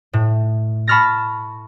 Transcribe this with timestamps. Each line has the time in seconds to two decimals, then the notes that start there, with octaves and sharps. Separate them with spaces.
0.13 A2
0.87 A5 B5 C#6 F6 A6 A#6